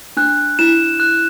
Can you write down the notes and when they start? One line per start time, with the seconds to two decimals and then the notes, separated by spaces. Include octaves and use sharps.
0.17 D4 F#6
0.59 E4 E7
1.00 F#6